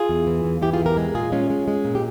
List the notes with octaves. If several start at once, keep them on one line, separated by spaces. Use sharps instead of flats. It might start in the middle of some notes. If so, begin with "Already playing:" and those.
Already playing: F4 G#4
E2
E3
E2
E3 E4 G4
F4 G#4
E2
G4 A#4
G#3
A#2 F4 G#4
G#3 C#4 F4
G#3
G#3
A#2
G4